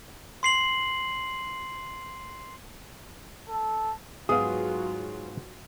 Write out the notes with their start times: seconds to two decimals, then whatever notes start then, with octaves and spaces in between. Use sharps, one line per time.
0.43 C6 C7 F#7
3.49 A4
4.29 G#2 F#3 B3 F4 G#4 F5 D#6